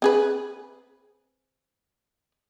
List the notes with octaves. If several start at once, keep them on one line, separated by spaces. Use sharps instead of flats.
C4 G#4 B4